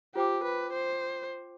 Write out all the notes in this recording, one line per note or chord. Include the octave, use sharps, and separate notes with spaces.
F4 G4 C5 G5 D6
B4
C5